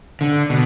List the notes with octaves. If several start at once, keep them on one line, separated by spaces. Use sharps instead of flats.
D3
B2